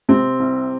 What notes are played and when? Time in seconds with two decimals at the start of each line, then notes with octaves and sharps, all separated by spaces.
0.09 C3 C4
0.39 C2